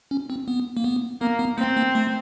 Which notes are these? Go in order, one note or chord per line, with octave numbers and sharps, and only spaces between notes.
C#4
C4
B3
A#3
B3
A#3 B3
B3
A#3 C4
A#3
A3